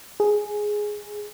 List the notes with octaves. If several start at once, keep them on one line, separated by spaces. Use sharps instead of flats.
G#4